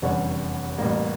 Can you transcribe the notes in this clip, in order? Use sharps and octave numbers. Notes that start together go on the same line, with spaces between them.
F1 E2 D3 G3 C#4
A1 A2 G3 A#3